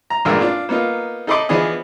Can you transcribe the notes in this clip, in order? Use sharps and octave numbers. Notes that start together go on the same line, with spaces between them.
A#5
A1 G2 A#2 G#3 A#4 E6
D4 F4
A#3 B3 D#4 F4
D#4 A4 D#5 B5 C6 D6
E3 F3 B3 D4 G#4 D#5